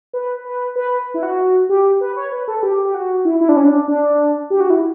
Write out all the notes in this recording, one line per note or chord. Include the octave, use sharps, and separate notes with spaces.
B4
B4
B4
E4
F#4
G4
B4
C#5
B4
A4
A4
G4
G4
F#4
E4
E4
D4
C#4
D4
D4
G4
F#4
E4